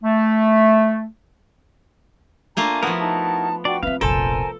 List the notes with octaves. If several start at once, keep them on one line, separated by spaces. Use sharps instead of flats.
A3
A3 A#3 D4 F4 G#5 A#5
F3 B3 E4 F#4 A#4
D#4 A5
D4 F#4 D5 G5
C4 D4 B4 E5 F5
F1 A#1 A4 A#4 C5 G#5 A5